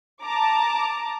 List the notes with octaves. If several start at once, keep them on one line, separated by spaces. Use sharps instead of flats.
A5 A#5 D6